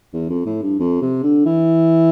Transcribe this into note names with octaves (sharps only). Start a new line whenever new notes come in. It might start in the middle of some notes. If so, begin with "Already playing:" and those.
E2
F2
A2
G2
F2
C3
D3
E3